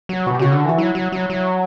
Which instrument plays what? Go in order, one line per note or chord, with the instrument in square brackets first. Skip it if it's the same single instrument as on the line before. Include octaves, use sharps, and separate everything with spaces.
[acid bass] F#3
[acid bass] B2 [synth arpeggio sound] F#4
[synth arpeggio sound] G4
[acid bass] C#3 [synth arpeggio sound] F#4
[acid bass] D3 [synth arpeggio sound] F#4
[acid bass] E3 [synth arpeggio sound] F#4
[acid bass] F#3 [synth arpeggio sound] E4
[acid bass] F#3
F#3
F#3